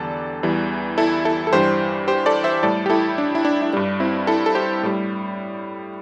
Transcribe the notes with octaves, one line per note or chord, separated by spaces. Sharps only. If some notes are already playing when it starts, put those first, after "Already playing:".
Already playing: E2 D3 G3 A4 D5
E2 E3 G3
E4 A4
E4 A4
A4
G2 E3 G3 G4 C5
G4 C5
A4 D5
C5 E5
A2 G3 A4 D5
G4
E4 A4
D4
E4
D4
E4
G2 G3 D4
C4 E4
E4 A4
A4
G4 C5
A2 G3